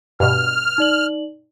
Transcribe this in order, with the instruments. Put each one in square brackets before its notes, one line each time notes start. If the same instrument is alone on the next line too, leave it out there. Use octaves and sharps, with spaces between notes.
[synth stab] G2 B2 [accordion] F6
[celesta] D#4 D5 F#7